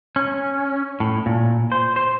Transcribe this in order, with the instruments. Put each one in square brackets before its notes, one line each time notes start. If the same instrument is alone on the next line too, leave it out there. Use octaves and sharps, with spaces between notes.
[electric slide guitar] C#4
A2
A#2
C5
C5